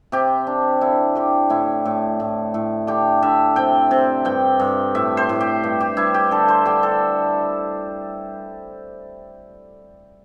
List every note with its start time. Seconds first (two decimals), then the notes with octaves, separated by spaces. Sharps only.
0.12 C3 G4
0.47 D4
0.81 D3 E4
1.15 D3 G4
1.50 A2 E4
1.85 A2
2.20 A2
2.54 A2
2.87 D3 G4
3.22 D3 E5
3.56 C3 G5
3.91 C3
4.25 G2 G5
4.60 G2
4.95 A2 E5
5.17 C5
5.29 A2
5.40 G4
5.64 G2
5.80 G4
5.97 G2 E4
6.14 G4
6.31 D3 A4
6.48 C5
6.66 D3 G4
6.83 A4